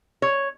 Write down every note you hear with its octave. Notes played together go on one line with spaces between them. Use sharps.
C#5